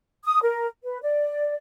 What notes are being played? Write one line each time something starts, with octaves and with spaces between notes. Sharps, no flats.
D#6
A#4
B4
D5